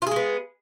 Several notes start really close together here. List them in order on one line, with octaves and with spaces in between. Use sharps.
F4 G#4 G#3 B3